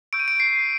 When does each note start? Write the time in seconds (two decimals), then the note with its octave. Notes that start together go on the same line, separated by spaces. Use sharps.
0.13 C#6 E6 G6 D7
0.19 D#7
0.28 D7
0.40 C7